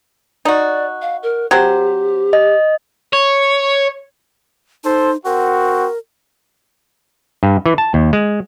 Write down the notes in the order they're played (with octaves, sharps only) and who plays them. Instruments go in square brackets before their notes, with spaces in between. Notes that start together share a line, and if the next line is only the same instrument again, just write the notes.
[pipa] D#4 F#4 [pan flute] D5
[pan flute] F5
A#4
[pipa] F#3 C4 C5 [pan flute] G4
[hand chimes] D#5
[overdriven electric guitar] C#5
[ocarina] D#4 [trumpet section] A4 C5
[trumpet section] C4 F#4 [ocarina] A#4
[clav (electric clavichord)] G2
E3
A5
D#2
G#3